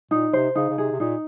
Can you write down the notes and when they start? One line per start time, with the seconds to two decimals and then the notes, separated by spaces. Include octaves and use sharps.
0.11 A#2 D#4
0.33 C3 C5
0.55 C#3 D#4
0.70 C#3
0.78 C3 G#4
0.92 C3
1.00 A#2 D#4